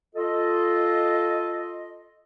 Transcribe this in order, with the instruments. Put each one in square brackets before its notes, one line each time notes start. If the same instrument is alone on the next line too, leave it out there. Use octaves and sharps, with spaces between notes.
[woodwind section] F4 A4 D#5